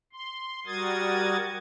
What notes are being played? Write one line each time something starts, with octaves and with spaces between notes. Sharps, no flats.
C6
G3 F#4 A#4 D#6 G#6 A6